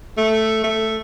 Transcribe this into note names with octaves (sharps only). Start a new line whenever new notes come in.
A3
A3